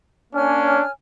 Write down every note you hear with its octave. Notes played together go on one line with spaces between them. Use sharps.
A#3 C#4 D4 C#5 G#5 F6